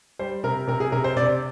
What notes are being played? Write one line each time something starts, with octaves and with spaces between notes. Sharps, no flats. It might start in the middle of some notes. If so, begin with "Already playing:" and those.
G3 C5
C3 A#4
C3 A#4
G#4
C3 A#4
C5
C3 D5